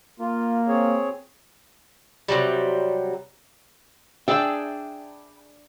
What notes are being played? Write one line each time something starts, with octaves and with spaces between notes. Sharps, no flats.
A#3 F4
C4 G#4 C#5
C3 F#3 G3
D4 G#4 D5 E5 G5 B5 E6